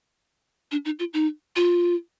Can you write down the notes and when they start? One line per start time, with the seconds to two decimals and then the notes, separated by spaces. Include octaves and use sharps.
0.71 D4
0.85 D#4
0.99 F4
1.13 D#4
1.56 F4